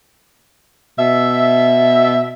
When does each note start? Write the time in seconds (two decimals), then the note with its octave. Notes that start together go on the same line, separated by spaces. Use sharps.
0.98 B2 E5